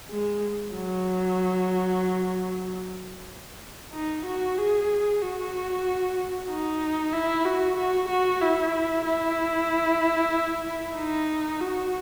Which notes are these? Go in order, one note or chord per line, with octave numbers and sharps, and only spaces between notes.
G#3
F#3
D#4
F#4
G#4
F#4
D#4
E4
F#4
F#4
F#4
E4
E4
D#4
F#4